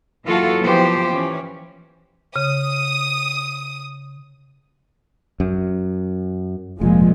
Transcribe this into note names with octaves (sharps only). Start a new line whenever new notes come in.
E3 F#3 A#3 F4 F#4 A4
E3 F3 B3 G4 C5
E3 C#4
C#3 D#6
F#2
F1 A#2 F3 G#3